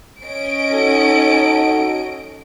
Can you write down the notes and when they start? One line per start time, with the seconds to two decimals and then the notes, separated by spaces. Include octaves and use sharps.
0.24 C#4 D#5 D7
0.71 D#4 F#4 A4